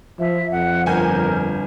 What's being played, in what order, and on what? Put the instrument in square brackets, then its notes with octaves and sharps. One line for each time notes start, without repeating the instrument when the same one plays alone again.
[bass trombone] F3 [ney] E5
[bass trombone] F2 [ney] F#5
[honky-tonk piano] G1 G#5 G6 [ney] A#4